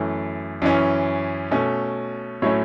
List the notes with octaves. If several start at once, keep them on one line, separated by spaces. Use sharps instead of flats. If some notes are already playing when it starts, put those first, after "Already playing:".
Already playing: F#2 E3 A3
F#2 E3 C#4
B2 A3 C#4
A2 F#3 A3 C#4 C#5